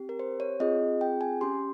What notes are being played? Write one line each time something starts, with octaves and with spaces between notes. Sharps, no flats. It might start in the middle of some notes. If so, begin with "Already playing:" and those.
Already playing: C4 G4
A#4
C5
C#5
C4 F4 G#4 D#5
G5
G#5
C#4 G4 C6